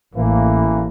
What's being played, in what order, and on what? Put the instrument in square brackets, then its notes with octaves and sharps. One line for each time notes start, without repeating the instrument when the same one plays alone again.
[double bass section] A1 [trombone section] A2 E3 A#3